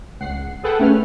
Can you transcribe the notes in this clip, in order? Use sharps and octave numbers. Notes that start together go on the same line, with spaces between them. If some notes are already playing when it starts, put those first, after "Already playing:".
C#2 F#5 C7
G#4 A4 B4 F#5 G5
A3 C#4 B4 F6